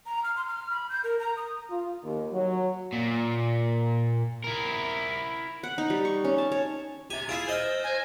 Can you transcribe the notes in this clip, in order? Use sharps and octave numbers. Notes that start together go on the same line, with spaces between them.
A#5
F6
C6
F6
B5
G6
A#4
A#5
D#6
F4
D#2
F#3
A#2
E4 A#4
F#5
D#4
G3
C#6
C#4
A5
C#5
G4 E5 G#5 A6 E7
E4 F4 G#4 E5 E6 D7
C5 D#5 F6 A#6
G#5 G#6 A#6